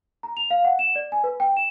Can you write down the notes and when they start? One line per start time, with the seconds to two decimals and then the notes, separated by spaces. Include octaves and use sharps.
0.23 A#5
0.37 F7
0.51 F5
0.65 F#5
0.79 E7
0.96 D5
1.12 G#5
1.24 B4
1.40 G5
1.57 E7